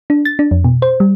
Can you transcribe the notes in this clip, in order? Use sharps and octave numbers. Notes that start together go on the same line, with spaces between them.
D4
A6
D4
F2
B2
C5
G3